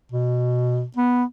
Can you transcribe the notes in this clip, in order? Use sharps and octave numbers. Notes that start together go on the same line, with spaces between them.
B2
B3